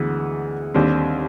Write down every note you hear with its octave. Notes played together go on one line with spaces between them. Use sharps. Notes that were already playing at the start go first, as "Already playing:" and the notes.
Already playing: D2 E3 G#3 B3
D#2 D3 G3 C4